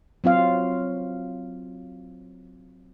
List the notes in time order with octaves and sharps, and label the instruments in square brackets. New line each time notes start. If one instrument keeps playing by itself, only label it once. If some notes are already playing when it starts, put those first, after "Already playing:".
[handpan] F#3 C4 F4 F5